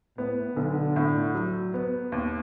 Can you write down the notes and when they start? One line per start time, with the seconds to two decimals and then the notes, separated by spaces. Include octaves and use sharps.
0.17 A2 B3
0.56 B1 D3
0.96 A2
1.34 F#3
1.74 B3
2.12 D#2